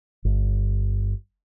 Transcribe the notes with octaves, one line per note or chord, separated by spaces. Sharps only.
G1